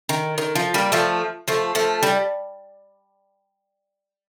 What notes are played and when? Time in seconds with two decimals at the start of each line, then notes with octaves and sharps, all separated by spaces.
0.09 D#3
0.38 D#3
0.55 F3
0.74 G3 A#3
0.92 F3 A3
1.48 F3 A3
1.75 F3 A3
2.03 G3